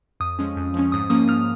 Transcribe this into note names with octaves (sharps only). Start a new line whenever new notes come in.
F2 D#6
F3 G#3 C#4
F2
F3 G#3 C#4
G#2 D#6
F3 A#3 C#4 D#6
G#2 F6